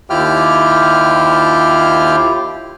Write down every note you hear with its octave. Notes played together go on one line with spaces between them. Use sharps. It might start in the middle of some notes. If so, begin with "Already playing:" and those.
D#2 E4 F4 G4 G5 F6